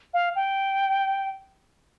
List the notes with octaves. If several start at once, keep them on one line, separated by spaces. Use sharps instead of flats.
F5
G5